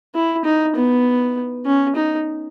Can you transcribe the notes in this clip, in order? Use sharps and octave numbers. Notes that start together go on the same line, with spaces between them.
E4
D#4
B3
C#4
D#4